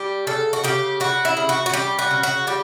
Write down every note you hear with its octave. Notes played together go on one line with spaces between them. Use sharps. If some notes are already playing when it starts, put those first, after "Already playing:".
Already playing: G3 G4
C#3 A4
F#4
C#3 G4
G3 F#4
E4
C#3
F#4
F#4
G3 G4
F#4
C#3
F#4
G3 G4